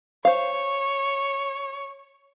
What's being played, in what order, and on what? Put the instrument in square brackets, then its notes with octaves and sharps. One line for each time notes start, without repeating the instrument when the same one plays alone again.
[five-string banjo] C5 F5 [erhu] C#5